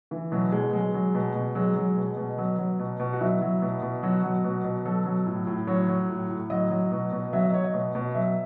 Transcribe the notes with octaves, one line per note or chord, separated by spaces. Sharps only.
E3
B2 F#3
B2 G#3
F#3 G#3
F#3
B2
B2
F#3 G#3
F#3
B2
B2
F#3 B3
F#3
B2
B2
F#4
F#3 E4
F#3
B2
B2
F#3 F#4
F#3
B2
B2
F#3 A4
F#3
A2
A2
F#3 C#5
F#3
A2
A2
F#3 D#5
F#3
B2
B2
F#3 E5
D#5
F#3 C#5
D#5
B2
B2
F#3 E5